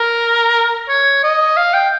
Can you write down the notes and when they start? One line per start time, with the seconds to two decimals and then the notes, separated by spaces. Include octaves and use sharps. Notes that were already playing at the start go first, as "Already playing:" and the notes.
Already playing: A#4
0.89 C#5
1.23 D#5
1.57 F5
1.74 G5